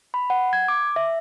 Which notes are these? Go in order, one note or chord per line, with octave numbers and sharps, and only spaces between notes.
B5
F#5
G#6
D6
E5